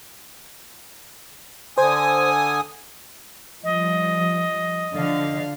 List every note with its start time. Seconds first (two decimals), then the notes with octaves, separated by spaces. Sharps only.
1.78 D3 C5 G#5 D#6
3.64 F3 G3 D#5
4.95 D3 F3 F5